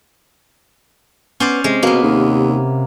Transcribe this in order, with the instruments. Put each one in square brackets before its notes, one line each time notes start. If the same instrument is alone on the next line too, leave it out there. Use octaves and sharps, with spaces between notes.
[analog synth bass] B3 [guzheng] C#4 C5 D5
[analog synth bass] C3 [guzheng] G#3
[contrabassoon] B2 [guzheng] A#3 B3
[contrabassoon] D#2